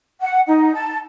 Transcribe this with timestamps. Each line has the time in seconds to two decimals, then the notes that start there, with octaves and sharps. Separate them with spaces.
0.20 F#5
0.46 D#4
0.74 A5